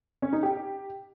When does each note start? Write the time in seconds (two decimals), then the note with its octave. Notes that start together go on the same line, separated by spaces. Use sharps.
0.22 C#4
0.33 D#4
0.43 G4